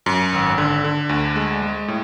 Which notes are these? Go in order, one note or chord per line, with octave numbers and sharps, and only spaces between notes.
F#2
G#1
D3
D3
D2
G#3
G#3
A2